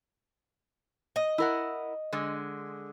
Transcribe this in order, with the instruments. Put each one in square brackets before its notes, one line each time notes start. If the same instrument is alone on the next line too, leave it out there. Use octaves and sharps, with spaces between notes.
[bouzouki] D#5
[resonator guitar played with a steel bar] E4 A#4 F#5
D3 G#3